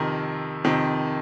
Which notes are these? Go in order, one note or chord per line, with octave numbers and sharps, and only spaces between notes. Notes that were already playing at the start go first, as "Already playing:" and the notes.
Already playing: F2 C3 D#3 A#4
F2 C3 D#3